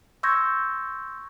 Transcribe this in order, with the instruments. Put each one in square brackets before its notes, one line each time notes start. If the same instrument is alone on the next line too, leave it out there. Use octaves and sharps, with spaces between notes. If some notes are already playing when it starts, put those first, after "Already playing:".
[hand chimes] C6 C#6 E6 G6 G#6 A#6